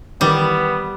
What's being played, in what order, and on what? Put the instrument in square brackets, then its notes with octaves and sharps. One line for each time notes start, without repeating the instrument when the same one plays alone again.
[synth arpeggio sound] D#3 E3 A#4 [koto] G3 [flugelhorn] B3